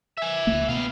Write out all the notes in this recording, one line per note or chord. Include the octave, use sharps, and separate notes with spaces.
E5 G#5
C#2 A3 A#3
B2 B3 F5